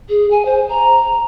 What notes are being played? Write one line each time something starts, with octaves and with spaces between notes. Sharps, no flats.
G#4
G#5
C5
A#5